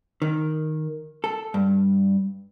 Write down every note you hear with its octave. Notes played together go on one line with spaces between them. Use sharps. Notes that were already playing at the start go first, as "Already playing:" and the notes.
D#3
A4
G2